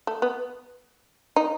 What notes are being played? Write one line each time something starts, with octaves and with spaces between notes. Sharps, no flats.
A3
B3
D#4